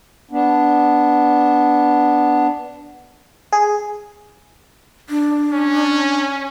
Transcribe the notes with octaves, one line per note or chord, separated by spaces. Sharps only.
B3 D4
G#4
D4
C#4